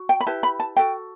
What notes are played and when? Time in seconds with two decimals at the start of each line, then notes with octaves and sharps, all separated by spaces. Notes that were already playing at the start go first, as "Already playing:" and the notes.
Already playing: F#4
0.09 G5
0.21 B5
0.26 E4 G4 B4 A5
0.43 B5
0.60 A5
0.77 F#4 A4 G5